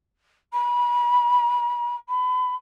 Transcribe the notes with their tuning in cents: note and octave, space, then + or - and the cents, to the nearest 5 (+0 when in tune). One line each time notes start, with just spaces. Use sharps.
B5 -30
B5 +30